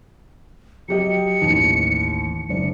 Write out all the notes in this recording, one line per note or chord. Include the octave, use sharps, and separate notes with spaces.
F#3 G4 D#5 C#7
A1 D#2
F#1 D4 C#7